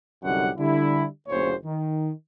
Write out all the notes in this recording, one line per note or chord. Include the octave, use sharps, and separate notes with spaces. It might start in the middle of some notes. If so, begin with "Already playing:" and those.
C2 F#2 D3 D#4 G4 F#5
D3 G3 E4
F#1 D2 A#2 C#3 C5 C#5
D#3